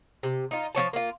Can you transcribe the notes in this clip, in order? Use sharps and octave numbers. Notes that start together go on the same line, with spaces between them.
C3
D#4 F4
F3 C4 C#5 A5
A#3 F4